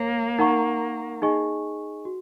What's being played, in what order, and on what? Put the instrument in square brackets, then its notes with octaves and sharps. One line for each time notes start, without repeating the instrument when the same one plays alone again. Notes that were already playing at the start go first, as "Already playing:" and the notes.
Already playing: [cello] A#3 [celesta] A#4 C#5
[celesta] D#4 A#4 F#5 A#5 C#6
D#4 G#4 D#5 G#5 C#6
F#4